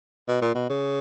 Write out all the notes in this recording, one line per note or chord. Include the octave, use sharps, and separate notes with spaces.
B2
A#2
B2
C#3